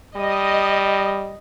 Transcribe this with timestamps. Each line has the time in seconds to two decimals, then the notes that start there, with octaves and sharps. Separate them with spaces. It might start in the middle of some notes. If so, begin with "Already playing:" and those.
0.16 G3 D#5